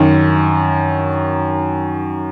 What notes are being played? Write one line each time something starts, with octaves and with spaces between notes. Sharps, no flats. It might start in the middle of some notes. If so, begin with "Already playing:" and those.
Already playing: F#2 D#3